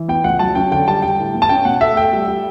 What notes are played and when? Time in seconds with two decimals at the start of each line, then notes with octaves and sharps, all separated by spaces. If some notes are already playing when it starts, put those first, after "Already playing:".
Already playing: E3
0.08 B3 G5
0.24 C#2 F#5
0.39 F#3 A5
0.55 C#4 G5
0.71 D3 G5
0.87 G3 A5
1.02 G3 G5
1.19 A2
1.34 B3
1.42 A5
1.49 C#4 G5
1.65 B2 F#5
1.81 A3 E5
1.96 A3 G5
2.13 G3
2.28 G3